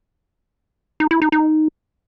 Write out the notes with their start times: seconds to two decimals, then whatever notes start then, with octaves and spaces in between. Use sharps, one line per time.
1.00 D#4
1.11 E4
1.22 D#4
1.32 D#4